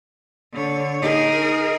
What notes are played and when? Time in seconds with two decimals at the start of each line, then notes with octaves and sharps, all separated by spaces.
0.53 D3 C#5
1.02 D#4 G#4 A#4